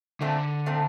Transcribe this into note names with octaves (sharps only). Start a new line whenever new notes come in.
A#2 D3 A3 C4
A#2 A3 C4